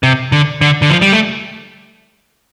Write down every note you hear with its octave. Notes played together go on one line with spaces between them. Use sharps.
C3
D3
D3
D3
F3
G3
A3